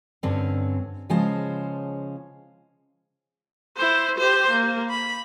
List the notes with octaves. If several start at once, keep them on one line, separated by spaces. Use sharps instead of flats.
G2 D3 C4 C#4
C#3 F3 G#3 C#4 C5 A5
E4 C5
G4 C5
A#3
B5